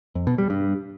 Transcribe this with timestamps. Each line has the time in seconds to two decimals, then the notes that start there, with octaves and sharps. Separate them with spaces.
0.15 F2
0.27 B2
0.38 G3
0.50 G2